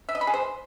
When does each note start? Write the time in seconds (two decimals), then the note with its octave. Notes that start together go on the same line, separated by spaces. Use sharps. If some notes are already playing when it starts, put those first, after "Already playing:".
0.09 E5
0.15 D#5
0.21 B5
0.27 G#4
0.34 C5